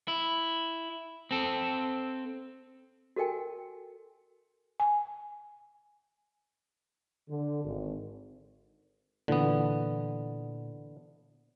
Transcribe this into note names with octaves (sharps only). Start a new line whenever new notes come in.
E4
C4 A4
F#4 A4 A#4 G5 G#5
G#5
D3
G#1
A#2 D3 E3 B3